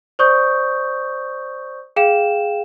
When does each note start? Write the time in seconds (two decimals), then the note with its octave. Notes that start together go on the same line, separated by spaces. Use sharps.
0.19 C5 D5 C#6 D#6 G6
1.96 G#4 F5 G5 E7